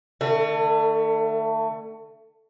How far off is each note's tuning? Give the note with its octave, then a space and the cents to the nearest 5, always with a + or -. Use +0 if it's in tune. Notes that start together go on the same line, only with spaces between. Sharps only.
D#3 -45 A3 +25